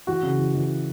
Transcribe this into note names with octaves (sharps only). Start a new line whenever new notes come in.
E3 F#4
C#3
E3
E3